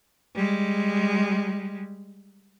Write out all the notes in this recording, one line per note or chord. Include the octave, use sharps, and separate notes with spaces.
G3 G#3